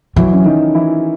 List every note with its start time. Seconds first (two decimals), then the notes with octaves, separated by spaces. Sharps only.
0.16 E3 F#3 E4
0.33 C#4
0.45 D#3 D#4
0.75 E3 E4